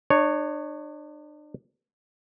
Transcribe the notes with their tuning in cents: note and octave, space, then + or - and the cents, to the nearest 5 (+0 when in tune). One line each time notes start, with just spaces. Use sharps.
D4 +40 C#5 +0